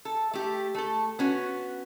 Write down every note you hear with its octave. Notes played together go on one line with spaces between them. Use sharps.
A4
A3 G4
A3 A4
B3 C#4 F#4